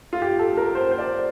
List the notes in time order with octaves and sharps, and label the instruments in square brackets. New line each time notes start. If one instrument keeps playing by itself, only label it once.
[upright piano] F4
G4
A4
A#4
C5
C5
D5